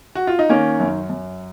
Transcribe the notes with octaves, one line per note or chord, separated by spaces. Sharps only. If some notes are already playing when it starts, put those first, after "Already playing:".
F#4
F4
D#4
D#3 A#3 C#4
F#2
F#2